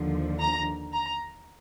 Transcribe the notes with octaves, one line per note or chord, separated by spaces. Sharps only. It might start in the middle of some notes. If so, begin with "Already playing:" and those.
Already playing: D#2 D3 F3
A#5
A#5